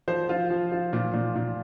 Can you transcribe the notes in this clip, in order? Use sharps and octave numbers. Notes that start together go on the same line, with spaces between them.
F3 C5
F4
F3
F4
A#2
A#2
A#2